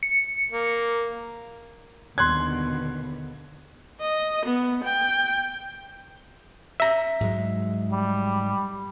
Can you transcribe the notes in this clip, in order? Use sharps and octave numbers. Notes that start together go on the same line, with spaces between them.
C#7
A#3
D#2 B2 D3 C6 F#6 G#6
D#5
B3
G5
E5 A#5
G#2 F#3 G#3
G3